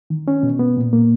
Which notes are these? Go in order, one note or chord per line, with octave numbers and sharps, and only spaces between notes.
D#3
C#4
B2
B3
A#2
A#3